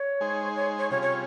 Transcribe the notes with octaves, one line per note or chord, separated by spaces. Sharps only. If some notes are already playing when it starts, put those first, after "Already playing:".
Already playing: C#5
G#3 D#4 G#4 C5
C#5
C#5
C3 G3 C#4 F4 G#4 C#5
C#5